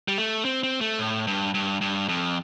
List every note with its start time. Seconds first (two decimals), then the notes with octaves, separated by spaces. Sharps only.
0.08 G3
0.18 A3
0.45 C4
0.63 C4
0.81 A3
0.99 A2
1.27 G2
1.54 G2
1.81 G2
2.09 F2